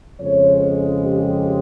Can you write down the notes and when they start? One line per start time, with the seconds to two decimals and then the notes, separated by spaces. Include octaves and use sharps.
0.19 F2 C#3 G#3 C#5
1.03 G4